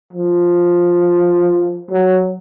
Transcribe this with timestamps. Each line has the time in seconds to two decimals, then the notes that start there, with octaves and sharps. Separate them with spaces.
0.13 F3
1.91 F#3